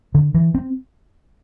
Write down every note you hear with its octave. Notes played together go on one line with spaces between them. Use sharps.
D3
E3
C4